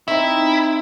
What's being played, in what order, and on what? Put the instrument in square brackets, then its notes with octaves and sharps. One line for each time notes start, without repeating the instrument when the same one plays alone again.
[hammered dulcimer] C4 D#4 E5 [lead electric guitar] E4